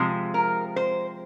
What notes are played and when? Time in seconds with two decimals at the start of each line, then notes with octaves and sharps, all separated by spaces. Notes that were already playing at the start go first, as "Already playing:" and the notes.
Already playing: C3 F3 G#3
0.34 A#4
0.76 C5